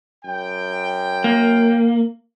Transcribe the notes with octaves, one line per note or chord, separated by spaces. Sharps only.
F#2 G5
A#3